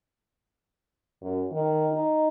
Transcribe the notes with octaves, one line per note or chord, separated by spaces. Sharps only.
F#2
D#3
D#4